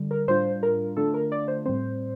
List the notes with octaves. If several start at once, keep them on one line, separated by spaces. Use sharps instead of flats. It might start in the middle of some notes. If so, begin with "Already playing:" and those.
Already playing: D3 G3
A#4
A2 G3 D4 F4 C5
A#4
D3 A3 D4 F4 A4
A#4
D5
C5
A2 G3 C4 C5